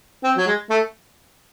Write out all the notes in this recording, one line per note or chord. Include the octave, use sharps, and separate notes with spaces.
C4
F#3
G#3
A3